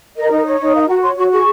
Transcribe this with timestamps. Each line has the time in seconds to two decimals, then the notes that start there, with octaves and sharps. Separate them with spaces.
0.16 A#4 D#5
0.31 D#4
0.46 C#5
0.60 D#4
0.75 A#4 F5
0.89 F#4 F#5
1.03 C#5 C6
1.18 F#4 C#6
1.32 G#4 C#6